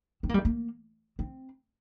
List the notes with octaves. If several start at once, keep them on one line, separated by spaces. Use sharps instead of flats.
C4
A#3
G3
A#3
C4